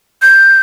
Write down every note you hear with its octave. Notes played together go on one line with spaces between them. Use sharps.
G6